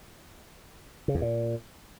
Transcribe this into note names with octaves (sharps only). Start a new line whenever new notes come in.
C#3
E2
A#2